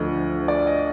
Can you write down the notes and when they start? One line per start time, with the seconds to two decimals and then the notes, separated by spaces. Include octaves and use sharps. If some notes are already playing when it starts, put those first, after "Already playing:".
Already playing: D2 D3 F3 D#5
0.48 D5
0.67 D#5